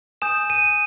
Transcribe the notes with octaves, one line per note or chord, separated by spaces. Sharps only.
G#5 D#6 G6 E7
D#7